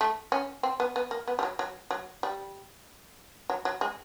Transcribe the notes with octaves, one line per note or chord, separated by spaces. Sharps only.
A3
C#4
C4
B3
B3
A#3
B3
G3
F#3
F#3
F#3
G3
F#3
F#3
G#3